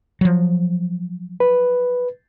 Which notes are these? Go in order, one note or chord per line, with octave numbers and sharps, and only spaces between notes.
F3 F#3
B4